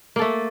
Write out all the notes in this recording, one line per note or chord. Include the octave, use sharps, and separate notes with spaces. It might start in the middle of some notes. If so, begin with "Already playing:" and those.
A3 A#3 A4